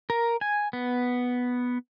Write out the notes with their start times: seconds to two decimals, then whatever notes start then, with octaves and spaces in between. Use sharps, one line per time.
0.10 A#4
0.41 G#5
0.73 B3